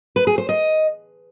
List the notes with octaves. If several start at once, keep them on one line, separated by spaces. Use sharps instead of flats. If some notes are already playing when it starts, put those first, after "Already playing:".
B4
G#4
C5
D#5